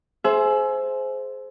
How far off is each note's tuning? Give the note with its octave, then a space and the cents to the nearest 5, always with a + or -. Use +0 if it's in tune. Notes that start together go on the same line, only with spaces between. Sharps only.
G#4 +30 C5 +0 E5 +10